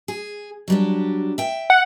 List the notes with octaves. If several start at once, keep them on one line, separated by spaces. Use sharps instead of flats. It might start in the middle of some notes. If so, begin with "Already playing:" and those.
G#4
F#3 G3 D4
E5 G5
F#5